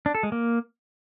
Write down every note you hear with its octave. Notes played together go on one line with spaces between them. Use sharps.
D4
A4
G#3
A#3